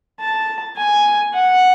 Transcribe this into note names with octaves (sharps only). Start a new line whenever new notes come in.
A5
G#5
F#5